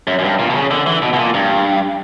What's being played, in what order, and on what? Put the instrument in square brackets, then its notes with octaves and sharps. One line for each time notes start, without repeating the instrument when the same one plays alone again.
[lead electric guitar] F#2
F#2
G2
A#2
B2
C#3
D3
E3
B2
B2
A#2
G2